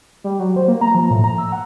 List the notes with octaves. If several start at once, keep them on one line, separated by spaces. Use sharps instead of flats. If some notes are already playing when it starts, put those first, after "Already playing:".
G3
F#3
C5
A#3
A#5
F3
A2
A#5
E6
F#5